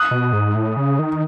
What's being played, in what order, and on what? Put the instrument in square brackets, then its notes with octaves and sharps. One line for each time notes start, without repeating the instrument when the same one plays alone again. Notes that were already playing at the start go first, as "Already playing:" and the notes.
Already playing: [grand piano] D#6 F#6
[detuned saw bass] B2
G#2
A2
C#3
D#3